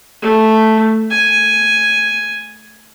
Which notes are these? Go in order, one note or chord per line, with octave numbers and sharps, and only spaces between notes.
A3
G#5